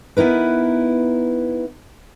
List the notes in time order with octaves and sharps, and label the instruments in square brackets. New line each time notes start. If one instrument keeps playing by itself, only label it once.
[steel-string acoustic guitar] B3 D#4 E4 A#4 B4